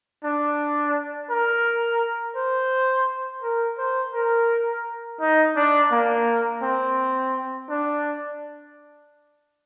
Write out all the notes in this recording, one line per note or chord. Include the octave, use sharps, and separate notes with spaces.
D4
A#4
C5
A#4
C5
A#4
D#4
D4
A#3
C4
D4